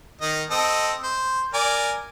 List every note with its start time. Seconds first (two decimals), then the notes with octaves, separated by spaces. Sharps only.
0.21 D#3 D#5
0.50 C4 A4 D#5
1.03 C5
1.54 A#4 D5 G#5